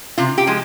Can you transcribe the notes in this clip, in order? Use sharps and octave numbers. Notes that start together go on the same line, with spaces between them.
C3 F4
G4
F3 G#3